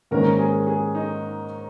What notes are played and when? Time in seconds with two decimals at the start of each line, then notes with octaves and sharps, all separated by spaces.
0.11 G#2 D#3 A#3 C#4 A#4
0.39 G#4
0.67 G#4
0.95 D#4